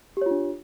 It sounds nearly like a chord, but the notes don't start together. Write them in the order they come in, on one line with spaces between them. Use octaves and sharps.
G4 C#5 F4 D4